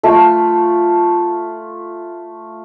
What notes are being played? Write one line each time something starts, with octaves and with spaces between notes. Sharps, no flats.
A3 F4